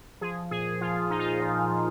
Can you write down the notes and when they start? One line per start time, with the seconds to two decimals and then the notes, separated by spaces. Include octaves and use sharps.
0.21 F3 G#4
0.51 A#2 G#4
0.81 F3 F4
1.10 A#2 D#4
1.19 F4
1.28 D#4
1.40 F3
1.70 F3